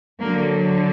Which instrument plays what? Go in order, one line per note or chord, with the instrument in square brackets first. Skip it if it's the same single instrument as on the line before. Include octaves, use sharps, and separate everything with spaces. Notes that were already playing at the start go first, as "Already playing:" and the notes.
[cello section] D3 F#3 A#3